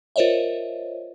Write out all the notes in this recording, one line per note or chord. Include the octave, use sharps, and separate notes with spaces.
F4 A#4 C5 C#5 D#5 E5